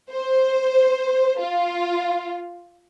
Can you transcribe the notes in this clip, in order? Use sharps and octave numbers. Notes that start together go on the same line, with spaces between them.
C5
F4